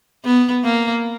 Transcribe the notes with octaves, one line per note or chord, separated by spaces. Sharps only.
B3
A#3